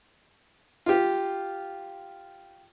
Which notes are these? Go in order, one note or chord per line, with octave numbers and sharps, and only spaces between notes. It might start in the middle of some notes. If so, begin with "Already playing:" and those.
F4 G4